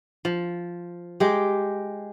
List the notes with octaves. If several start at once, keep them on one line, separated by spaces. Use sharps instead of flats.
F3
G#3 G4